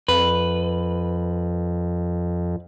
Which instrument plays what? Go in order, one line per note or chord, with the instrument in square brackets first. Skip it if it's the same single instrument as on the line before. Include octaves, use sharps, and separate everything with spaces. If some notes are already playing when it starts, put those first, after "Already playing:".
[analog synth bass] F2 [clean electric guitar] B4